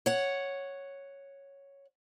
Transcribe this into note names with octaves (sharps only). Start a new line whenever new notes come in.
C#5 F#5